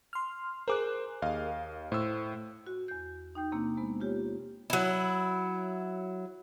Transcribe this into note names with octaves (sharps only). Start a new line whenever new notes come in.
C6 F6
G#4 A#4 C5 D6 F#6
D#2 D#5 F5
A2 C5 E6
F#4
E2 G6
D#4 G5 G6
C3 A#3 C4 D4
G#3 B3 C5
A#3 F4 G4 C#5
F#3 E4